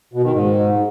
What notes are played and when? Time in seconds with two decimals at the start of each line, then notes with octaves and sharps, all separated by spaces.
0.13 B2
0.23 D#3
0.33 G#2